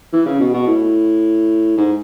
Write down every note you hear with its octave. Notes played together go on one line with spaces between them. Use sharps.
E3
C#3
B2
B2
A2
G#2